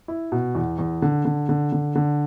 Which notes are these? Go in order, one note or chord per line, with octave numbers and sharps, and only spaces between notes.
E4
B2
E2
E2
D3
D3
D3
D3
D3